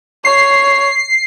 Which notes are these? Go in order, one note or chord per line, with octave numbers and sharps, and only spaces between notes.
C#5 C7